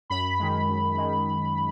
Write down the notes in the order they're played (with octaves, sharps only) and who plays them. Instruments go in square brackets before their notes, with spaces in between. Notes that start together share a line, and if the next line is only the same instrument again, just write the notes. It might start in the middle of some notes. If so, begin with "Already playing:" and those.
[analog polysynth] F#2 B5
D#3 G#3
F#2
D#3 G#3